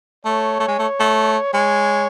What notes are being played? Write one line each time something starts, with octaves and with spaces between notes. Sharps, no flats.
A3 C#5
A3
G#3
A3
A3
G#3 C#5